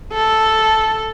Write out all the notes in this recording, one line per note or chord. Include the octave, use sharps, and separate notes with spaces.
A4